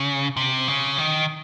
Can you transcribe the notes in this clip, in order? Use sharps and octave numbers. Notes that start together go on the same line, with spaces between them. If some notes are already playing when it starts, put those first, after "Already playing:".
Already playing: C#3
C3
C#3
D#3